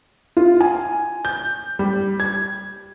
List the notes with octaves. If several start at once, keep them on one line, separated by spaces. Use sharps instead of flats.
F4
G#5
G6
G3
G#6